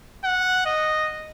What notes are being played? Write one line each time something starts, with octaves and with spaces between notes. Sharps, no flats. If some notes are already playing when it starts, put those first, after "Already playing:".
F#5
D#5